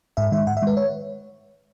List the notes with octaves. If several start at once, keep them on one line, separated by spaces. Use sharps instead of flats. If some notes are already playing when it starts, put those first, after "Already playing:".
G#2 E5
D#3 G#3 E5
G#2 F#5
E5
D#3 G#3 B4
C#5